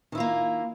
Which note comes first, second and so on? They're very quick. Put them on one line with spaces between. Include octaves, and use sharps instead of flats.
D#3 E4 F4 A#3